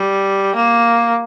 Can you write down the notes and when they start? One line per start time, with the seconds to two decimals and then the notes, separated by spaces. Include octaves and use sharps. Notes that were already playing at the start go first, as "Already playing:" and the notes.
Already playing: G3
0.55 A#3